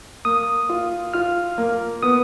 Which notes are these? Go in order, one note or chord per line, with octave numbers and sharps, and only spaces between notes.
A#3 D#6
F4
F4 F6
A#3
B3 D#6